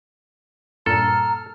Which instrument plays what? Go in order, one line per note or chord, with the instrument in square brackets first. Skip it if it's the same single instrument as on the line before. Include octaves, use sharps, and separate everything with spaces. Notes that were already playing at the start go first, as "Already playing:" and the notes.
[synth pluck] G2 A#2 [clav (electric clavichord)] A4 [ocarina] A#5 [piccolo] F6